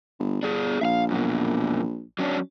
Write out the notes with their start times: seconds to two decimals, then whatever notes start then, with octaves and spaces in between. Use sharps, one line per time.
0.20 G1
0.43 G1 D4 G#4
0.81 A#1 E5 F5
1.10 F#2 B2
2.19 F#3 C#4 D4